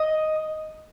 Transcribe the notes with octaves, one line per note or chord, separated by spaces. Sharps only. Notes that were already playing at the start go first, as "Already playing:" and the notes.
Already playing: D#5 D#6